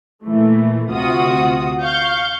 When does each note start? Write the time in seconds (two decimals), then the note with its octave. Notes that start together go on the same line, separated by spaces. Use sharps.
0.24 A#2 E3 A3
0.89 D2 C3 F4 F#4 D#6
1.83 F5 C#6 G6